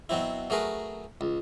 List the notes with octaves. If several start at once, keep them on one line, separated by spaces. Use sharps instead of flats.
B2 F#3 C4 E4
F#3 A3 G#4 A#4 B4
C#2